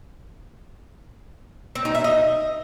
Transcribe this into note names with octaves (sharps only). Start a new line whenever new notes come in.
C4
D#4
E5
D#5